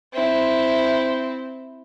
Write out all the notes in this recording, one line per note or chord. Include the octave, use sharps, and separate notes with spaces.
C4 E4